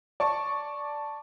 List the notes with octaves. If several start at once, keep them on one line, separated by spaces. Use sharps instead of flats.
D5 A5 C#6